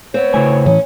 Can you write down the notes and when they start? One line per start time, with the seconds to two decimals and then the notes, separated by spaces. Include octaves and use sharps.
0.14 B3 C4 C#5
0.34 C#3 A3 E4 G#5
0.66 A2 E3 C#4